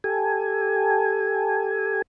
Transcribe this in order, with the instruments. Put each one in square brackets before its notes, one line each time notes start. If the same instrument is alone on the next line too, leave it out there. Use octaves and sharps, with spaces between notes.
[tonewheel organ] G4 A4 G#5